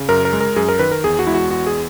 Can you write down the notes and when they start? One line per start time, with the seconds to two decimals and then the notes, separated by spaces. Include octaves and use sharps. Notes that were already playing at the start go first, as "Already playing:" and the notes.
Already playing: C#3
0.09 F#2 A#4
0.25 A#4
0.33 G#3
0.41 A#4
0.56 F#2 G#4
0.69 A#4
0.79 D#3 B4
0.92 A#4
1.04 E2 G#4
1.19 F#4
1.27 G#3 E4
1.34 F#4
1.50 E2 F#4
1.67 G#4